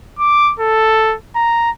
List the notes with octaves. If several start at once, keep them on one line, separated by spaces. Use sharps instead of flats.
D6
A4
A#5